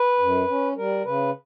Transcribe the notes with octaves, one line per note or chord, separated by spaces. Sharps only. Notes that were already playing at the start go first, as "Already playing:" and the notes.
Already playing: B4
F#2
C#4
G3 A#4
C#3 B4